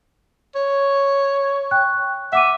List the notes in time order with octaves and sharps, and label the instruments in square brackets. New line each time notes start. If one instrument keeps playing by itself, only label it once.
[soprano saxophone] C#5
[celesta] G5 C#6 F#6
[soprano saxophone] E5 [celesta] F#5 D6 D#7